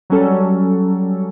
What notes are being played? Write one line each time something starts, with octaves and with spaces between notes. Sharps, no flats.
F#3 G3 C#4 A4